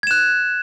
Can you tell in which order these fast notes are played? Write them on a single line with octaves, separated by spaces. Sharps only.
G#6 E7 F#6